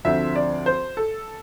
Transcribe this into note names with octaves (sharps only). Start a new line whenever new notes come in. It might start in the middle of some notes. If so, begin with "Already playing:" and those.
D2 D3 F3 C4 E5
D5
C5
A4